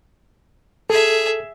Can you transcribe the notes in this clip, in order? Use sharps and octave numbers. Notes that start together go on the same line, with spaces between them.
G#4 A4 E5